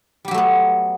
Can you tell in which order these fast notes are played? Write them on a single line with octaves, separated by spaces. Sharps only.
G3 G4 F#3 A3 B3